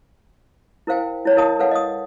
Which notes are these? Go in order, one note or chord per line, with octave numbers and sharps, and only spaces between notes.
E4 A#4 C5 F5 G5 G#5
E4 C#5 A5
E4 A#4 D#5 F5 A5 D#6
A4 B4 C#5 F5 F#5 G#5
D#5 F5 D#6